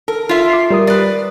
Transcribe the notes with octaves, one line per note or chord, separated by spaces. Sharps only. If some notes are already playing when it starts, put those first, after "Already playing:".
A4 A#4
F4 E5
D6 C7
G3 A#4 D#6
B4 D5